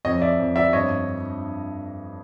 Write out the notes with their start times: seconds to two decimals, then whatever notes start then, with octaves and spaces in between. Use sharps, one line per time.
0.05 F2 C#5 D#5
0.22 D5 E5
0.39 F2
0.56 D5 E5
0.73 G2 C#5 D#5